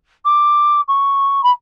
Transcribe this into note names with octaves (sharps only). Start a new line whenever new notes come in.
D6
C#6
B5